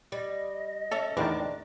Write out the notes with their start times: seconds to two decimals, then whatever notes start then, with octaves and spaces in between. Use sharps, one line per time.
0.12 G3 D#5
0.91 C#4 A4 E5
1.17 E2 A2 D#3 C4 D4